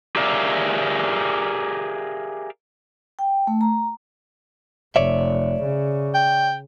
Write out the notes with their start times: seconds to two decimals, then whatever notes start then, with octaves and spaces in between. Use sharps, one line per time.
0.16 G4 G#4 A#4 D5 E5 F5
3.19 G5
3.47 A3
3.61 A#5
4.96 F1 C#5 D5 E5
5.64 C#3
6.14 G5